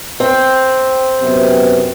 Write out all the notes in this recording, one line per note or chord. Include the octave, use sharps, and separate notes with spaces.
C4
F#2 C3 B3